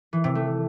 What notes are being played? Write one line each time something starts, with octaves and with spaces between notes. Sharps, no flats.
E3
C3
A3